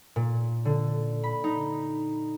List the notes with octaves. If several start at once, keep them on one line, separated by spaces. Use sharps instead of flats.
A#2
D3
B5
D#4